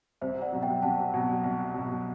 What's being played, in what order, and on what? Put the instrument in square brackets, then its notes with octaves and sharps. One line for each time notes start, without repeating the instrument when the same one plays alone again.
[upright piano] C2 [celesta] C5 E5
[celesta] D5 F#5
[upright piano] B2 F#3
[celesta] E5 G5
[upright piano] C2 [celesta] F#5 A5
[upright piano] B2 F#3
C2
B2 F#3